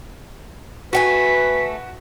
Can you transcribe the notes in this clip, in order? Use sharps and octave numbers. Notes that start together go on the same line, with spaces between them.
A3 F#4 B4 G5 G#5 B6